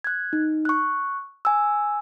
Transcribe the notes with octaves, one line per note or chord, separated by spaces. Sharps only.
F#6 G#6
D#4
C#6 F#6
G#5 E6